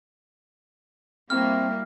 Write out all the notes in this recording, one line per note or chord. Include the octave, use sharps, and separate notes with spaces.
G3 A#3 C4 E4 F#4 G5 F6